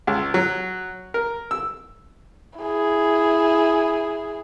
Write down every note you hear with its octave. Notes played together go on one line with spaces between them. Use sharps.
C#2
F#3
A#4
E6
E4 G#4